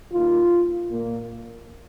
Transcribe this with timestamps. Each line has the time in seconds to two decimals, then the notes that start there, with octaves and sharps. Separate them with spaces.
0.12 D#2 D#3 A#3 F4
0.90 A#2 A#3